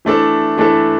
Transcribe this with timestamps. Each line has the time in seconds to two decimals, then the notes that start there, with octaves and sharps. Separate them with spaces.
0.05 E3 A3 D4 A4
0.57 E3 A3 D4 A4